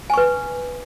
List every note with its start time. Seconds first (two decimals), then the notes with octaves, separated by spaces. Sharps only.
0.10 G#5
0.14 C#6
0.17 B4